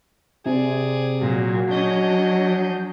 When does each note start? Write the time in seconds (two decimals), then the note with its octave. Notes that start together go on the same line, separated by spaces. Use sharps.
0.46 C3 G#4 D5
1.20 A#2 F#3 F#4
1.71 F#3 C#4 D4 D#5 G6